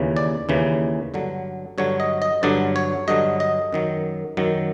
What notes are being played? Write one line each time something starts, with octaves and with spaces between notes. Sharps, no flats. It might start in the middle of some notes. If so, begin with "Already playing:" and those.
Already playing: D#2 C#3 E3
D5
D#2 C#3 E3
G2 D3 F#3
G2 D3 F#3 C#5
D#5
D#5
G2 D3 F#3 D5
C#5
G2 D3 F#3 D#5
D#5
F#2 D#3 F#3
F#2 D#3 F#3